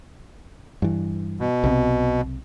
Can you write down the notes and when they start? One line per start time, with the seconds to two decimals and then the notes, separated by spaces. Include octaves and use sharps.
0.82 G2 E3
1.40 B2
1.64 B1 C3 C4